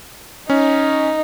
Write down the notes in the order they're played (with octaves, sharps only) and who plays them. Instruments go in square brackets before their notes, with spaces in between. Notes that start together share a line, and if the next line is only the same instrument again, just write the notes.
[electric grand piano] C#4 [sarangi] D#4